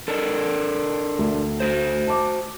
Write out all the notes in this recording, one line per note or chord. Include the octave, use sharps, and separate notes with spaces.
D4 A4 A#4
D2
F#4 C5
A5 D6